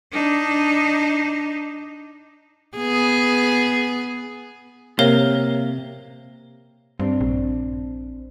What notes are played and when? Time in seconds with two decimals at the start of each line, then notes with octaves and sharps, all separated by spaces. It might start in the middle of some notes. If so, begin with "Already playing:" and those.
0.12 D4 D#4
2.77 B3 G#4
4.99 C3 A#3 A#4 C#5 F5
7.00 G2 C4 D4
7.21 A#1